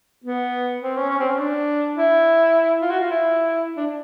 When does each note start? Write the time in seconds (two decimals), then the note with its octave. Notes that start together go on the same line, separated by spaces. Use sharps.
0.24 B3
0.82 C4
0.97 C#4
1.10 C#4
1.19 C4
1.29 C#4
1.39 D4
1.96 E4
2.81 F4
2.90 F#4
3.00 F4
3.10 E4
3.76 D4